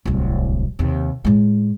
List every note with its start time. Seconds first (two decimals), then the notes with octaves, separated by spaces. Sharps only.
0.05 D1 C2
0.79 D#2 C3
1.25 A2 G#3